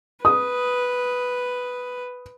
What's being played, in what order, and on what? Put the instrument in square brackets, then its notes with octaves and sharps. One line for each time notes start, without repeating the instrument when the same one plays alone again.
[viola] B4 [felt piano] D#6